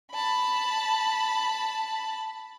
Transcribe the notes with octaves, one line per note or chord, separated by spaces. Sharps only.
A5 B5